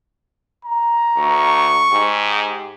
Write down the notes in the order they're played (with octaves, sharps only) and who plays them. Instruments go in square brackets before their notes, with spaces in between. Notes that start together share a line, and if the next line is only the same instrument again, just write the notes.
[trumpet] A#5
[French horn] D2 [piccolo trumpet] C#6
[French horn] G#2 [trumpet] G4